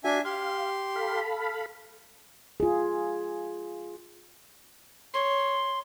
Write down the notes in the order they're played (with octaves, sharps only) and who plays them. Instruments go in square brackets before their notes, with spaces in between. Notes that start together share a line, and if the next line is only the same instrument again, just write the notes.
[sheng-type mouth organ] D4 E5 G#5 [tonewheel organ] F#4
[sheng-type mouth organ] G4 C6 [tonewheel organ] F5
[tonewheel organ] A4 F5 B5
[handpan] F4 G#4
[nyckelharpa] C#5 [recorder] C6